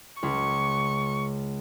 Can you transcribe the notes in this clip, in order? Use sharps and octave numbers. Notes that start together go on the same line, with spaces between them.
C#2 C#6